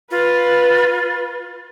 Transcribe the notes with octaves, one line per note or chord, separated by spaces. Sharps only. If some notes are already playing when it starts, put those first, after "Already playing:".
F4 B4